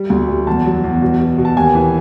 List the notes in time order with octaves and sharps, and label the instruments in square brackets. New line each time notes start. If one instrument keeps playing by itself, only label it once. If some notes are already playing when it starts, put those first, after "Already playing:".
Already playing: [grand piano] G3
D2
G3
E2 A5
F#3
E2
B2
B2
B2
A5
D#2 G#5
E3